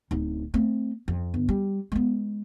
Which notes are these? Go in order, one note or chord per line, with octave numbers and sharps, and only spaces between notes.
D1 D#4
A3 C4
F2
G1
G3
G#3 B3